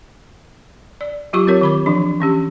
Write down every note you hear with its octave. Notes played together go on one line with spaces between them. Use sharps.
D5
F#3 F4 G4 C#6
C4 G4 A#4 C#5
D#3 B5 D6
E3 F3 D4
E3 C#4 G4